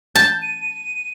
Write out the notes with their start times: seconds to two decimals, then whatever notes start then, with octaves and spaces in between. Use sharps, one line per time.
0.15 A5 G6
0.42 D#7